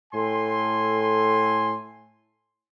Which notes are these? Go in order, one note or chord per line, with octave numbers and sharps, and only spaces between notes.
A2 A4 G#5 C6